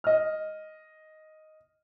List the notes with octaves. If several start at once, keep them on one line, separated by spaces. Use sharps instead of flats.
D#5 F6